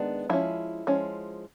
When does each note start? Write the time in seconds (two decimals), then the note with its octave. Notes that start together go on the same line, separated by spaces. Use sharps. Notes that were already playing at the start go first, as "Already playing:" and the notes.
Already playing: D#3 G#3 B3 D4
0.30 F3 G#3 C#4 E4
0.87 F3 G#3 C#4